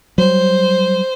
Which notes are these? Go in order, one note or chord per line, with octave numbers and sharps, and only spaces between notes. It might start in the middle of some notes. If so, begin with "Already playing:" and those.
F#3 G3 C5